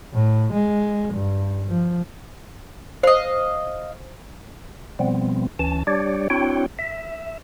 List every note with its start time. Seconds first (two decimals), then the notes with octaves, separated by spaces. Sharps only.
0.13 A2
0.53 G#3
1.13 G2
1.68 F3
3.03 C5 D#5 F5
4.99 B2 F3 G3 B3 C4
5.59 D2 E3 C#4 A5
5.87 G3 D4 G4 C#5 D5
6.30 C4 D4 E4 F#4 C#5 G5
6.79 E5